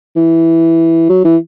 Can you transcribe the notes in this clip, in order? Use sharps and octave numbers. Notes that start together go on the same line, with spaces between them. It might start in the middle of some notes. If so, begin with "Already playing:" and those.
E3
F#3
E3